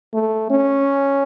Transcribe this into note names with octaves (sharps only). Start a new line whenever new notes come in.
A3
C#4